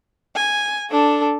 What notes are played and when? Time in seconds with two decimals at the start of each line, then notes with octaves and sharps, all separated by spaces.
0.36 G#5
0.90 D4 A4